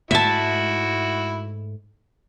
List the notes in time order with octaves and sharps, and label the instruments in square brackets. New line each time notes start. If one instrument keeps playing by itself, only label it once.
[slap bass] G#2 G#3 A3 [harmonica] E4 F#4 [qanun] E5 A5